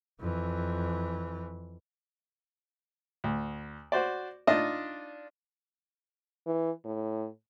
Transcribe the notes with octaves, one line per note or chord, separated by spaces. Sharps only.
F2 E3
D2
F#4 C5 D5
D4 D#4 F4 D5 D#5
E3
A2